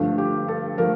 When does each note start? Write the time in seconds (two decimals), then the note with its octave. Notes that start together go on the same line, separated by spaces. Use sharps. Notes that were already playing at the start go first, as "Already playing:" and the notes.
Already playing: G2 D3 F3 A3
0.18 G4
0.48 A4
0.78 F3 A3 A#4